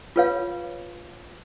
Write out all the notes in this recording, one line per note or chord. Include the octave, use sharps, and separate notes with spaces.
F4 A4 B4 C#5 F5